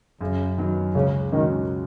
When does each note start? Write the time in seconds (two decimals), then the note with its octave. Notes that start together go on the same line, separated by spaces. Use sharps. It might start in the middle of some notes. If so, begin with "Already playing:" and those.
0.21 F#2 C#3
0.58 D#3 F#3 B3
0.95 C#2 C#3
1.32 B2 D#3 G#3 C#4 F#4